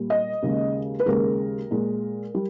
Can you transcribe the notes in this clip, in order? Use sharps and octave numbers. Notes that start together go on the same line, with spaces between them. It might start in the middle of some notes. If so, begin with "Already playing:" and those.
Already playing: A#2 G3
D#5
D#2 C#3 G#3
B4
D#2 C#3 G#3 A#4
A#2 G#3
G3